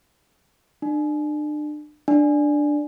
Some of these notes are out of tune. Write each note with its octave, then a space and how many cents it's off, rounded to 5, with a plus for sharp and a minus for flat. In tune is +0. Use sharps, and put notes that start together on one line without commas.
D4 +35
D4 +5